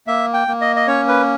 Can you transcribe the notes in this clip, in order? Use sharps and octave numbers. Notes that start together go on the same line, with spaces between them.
A#3 E5
G5
A#3
D#5
D#5
C#4 C#5
B4